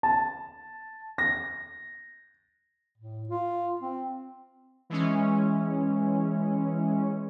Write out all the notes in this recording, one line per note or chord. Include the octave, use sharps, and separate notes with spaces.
A5
A#6
A2
F4
C4
E3 G#3 C#4